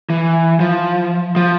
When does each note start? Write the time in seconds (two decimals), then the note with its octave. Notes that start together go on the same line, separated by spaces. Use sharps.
0.10 E3
0.60 F3
1.36 F3